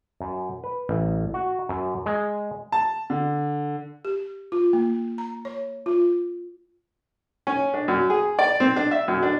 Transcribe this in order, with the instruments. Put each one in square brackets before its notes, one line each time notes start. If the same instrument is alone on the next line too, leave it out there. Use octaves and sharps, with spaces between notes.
[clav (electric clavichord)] F#2
B4
A1
F#4
F#2
G#3
[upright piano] A5
D3
[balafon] G4
F4
A#3
A#5
C#5
F4
[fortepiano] C#4
D4
F#2
G#4
D5
C4
D4
E5
F#2
D4